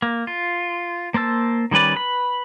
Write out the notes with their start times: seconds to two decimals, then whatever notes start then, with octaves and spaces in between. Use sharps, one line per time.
0.02 A#3
0.27 F4
1.14 A#3 C5 A5 E6
1.71 D#3 G3 C#4 B4 D5
1.96 B4 B5